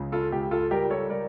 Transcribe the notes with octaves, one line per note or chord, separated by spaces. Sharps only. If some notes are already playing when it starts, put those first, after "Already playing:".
Already playing: C#2 C#3
F4 A4
C#2 G4
F4 A4
G3 G4 A#4
A4 C#5
G3 A#4 D5